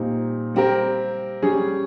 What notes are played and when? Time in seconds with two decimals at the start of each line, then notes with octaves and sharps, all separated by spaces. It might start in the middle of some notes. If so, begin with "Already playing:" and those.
Already playing: A#2 G3 C4 D#4
0.54 G3 C4 G4 A#4
1.42 G3 C#4 G#4